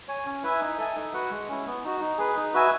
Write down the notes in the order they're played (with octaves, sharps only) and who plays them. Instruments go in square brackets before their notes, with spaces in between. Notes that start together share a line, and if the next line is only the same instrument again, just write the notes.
[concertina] C#5 G#5
C#4
E4 B4 E5 G#5
D#4
A4 E5 G#5
D#4
F#4 B4 F#5
G#3
C#4 E4
B3
D#4 F#4
D#4
G#4 B4
D#4
F#4 B4 E5 G#5